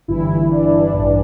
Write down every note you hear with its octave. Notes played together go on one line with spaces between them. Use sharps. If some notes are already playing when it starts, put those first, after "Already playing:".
G1 G2 E3 E4
D4
A1 G2 E3